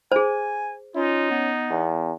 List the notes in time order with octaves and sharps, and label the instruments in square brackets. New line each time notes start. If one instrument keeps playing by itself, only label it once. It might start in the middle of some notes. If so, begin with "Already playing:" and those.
[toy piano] G#4 C5 [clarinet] G#5
[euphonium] C#4 [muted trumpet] D#4 [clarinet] F4
[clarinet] B3
[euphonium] E2